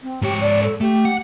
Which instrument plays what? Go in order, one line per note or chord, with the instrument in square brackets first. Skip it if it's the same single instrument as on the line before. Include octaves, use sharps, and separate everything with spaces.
[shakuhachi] C4
[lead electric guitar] G#2 C#5 [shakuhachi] G4
[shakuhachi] D5
A4
[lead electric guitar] A3 [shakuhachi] G4
[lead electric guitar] F#5